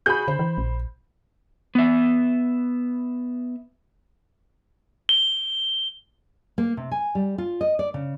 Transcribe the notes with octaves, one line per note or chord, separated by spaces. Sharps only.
F#4 G#4 G#5 B5 G6
D3 C5
E3
A#1
B3 E5
G7
A#3
C3
G#5
G3
F4
D#5
D5
C#3